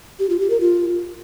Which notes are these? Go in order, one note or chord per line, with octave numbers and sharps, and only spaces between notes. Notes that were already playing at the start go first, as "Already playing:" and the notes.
G4
F4
G4
A#4
F4